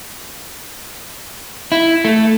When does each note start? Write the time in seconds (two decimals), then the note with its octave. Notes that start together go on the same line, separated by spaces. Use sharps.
1.72 E4
2.05 A3